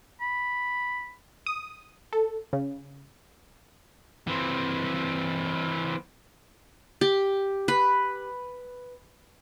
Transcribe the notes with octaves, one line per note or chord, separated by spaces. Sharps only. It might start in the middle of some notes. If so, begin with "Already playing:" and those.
B5
D#6
A4
C#3
E3 C4
G4
B4